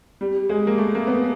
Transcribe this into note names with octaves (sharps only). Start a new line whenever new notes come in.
G3
G#3
A#3
A3
A#3
B3